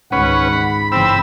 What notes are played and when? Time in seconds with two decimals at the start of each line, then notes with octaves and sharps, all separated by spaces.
0.12 C#2 G#2 D#3 C#4 B4 F#5
0.53 C#2 B5
0.92 G1 C#3 E3 C4 B5 E6